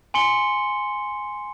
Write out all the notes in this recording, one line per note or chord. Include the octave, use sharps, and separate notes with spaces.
G#5 C6 C#7 G7